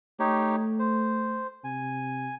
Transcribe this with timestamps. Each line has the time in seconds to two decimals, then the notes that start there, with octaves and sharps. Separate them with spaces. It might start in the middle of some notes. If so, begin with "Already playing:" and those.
0.20 A3 D#4 G4 C#5
0.79 C5
1.64 C3 G#5